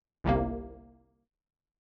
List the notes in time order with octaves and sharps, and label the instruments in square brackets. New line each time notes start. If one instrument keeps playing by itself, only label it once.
[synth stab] G1 C2 C3 A#3